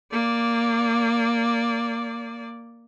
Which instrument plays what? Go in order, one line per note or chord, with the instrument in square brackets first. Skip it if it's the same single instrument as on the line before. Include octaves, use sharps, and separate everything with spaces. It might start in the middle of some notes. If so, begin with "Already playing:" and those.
[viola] A#3 D5